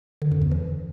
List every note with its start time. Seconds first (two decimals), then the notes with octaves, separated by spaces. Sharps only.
0.22 D3
0.32 F#2
0.42 E2
0.52 E3